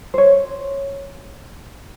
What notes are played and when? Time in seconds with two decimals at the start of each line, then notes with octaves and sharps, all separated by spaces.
0.14 C5 C#5